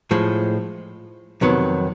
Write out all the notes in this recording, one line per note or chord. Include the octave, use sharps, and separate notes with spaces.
A2 F3 G#3
F2 C3 D#3 F#3 B3